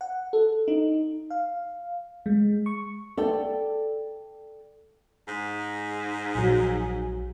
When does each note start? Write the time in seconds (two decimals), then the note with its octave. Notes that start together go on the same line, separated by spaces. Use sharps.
0.01 F#5
0.33 A4
0.68 D#4
1.30 F5
2.26 G#3
2.66 C#6
3.17 A4 D5 G5
5.28 G#2
6.35 A#1 F#3